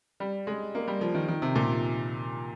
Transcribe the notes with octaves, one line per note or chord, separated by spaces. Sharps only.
G3
G#3
A#3
G3
F3
D#3
D#3
C3
A#2